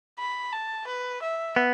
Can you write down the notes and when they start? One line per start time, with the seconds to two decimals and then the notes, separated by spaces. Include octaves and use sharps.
0.19 B5
0.53 A5
0.87 B4
1.22 E5
1.56 B3